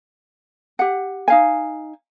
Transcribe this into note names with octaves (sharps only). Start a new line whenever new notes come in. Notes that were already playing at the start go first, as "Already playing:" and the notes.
G4 F#5
D#4 F5 G#5